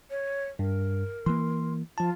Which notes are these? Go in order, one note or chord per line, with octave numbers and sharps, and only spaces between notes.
C#5
G2 A#4
E3 A#3 C6
F3 F4 A5